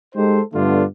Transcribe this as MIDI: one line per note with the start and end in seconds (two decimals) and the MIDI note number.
0.15 0.40 56
0.15 0.40 63
0.15 0.40 67
0.15 0.40 69
0.15 0.40 72
0.53 0.82 43
0.53 0.82 50
0.53 0.82 57
0.53 0.82 59
0.53 0.82 62
0.53 0.82 65